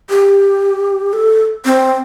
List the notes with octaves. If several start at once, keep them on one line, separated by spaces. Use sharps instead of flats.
G4
A4
C4